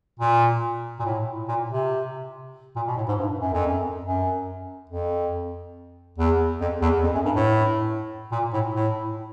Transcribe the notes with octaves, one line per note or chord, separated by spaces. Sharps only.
A#2
A#2
A2
A#2
C3
A#2
B2
A2
G#2
G2
F#2
F2
F#2
F#2
F2
E2
F2
E2
F2
F#2
G2
A2
A#2
A2
A2